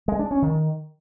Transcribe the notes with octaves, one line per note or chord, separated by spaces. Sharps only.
G#3
D4
C#4
D#3